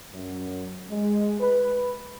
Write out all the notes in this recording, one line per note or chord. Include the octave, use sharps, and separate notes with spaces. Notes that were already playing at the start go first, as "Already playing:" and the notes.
F#2
G#3
B4